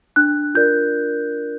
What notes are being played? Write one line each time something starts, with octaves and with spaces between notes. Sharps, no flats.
D4 F#6
F4 A#4 D5 G6